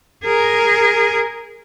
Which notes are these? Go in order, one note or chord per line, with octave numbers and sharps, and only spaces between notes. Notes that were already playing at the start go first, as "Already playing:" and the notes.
G#4 A#4